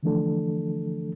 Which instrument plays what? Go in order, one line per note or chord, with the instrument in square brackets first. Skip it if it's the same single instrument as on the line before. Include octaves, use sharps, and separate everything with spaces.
[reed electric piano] D3 E3 F3 A3 D4 A4